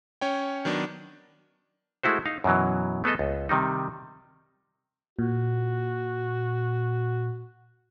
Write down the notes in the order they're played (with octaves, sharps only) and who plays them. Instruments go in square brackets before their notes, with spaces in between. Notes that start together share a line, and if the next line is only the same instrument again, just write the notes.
[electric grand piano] C#4 C#5 G5
D#3 F#3 B3 D4
[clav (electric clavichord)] G#3 A3 E4 F#4 C5
D#4 F5
F#2 B2 E3 F#3
A3 B3 G#4 A4 D#5
C#2
C3 D#3 G3 D#4
[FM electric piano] A#2 [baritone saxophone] F#4